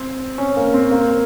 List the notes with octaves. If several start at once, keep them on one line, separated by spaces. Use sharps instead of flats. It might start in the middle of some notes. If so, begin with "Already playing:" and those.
Already playing: C4
C#4
A#3
C4
A#3